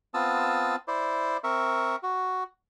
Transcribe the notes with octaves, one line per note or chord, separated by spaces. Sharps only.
B3 C4 F4 A5 D#6 E6
E4 C5 D5
C4 A#4 E5 C#6
F#4